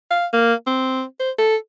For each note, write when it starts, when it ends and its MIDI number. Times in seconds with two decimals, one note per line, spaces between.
0.11 0.26 77
0.33 0.54 58
0.67 1.03 60
1.20 1.31 72
1.38 1.56 69